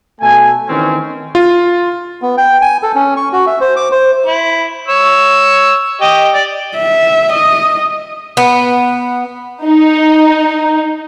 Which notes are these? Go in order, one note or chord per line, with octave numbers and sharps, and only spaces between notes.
B2 A3 G#5
D#3 E3 C4 C#4
F4
B3
G5
G#5
A4
C#4
C#6
F#4
E5
C5
D6
C5
E4
C#5 E6
G4 D#5
D5
E5
D#5
B3
D#4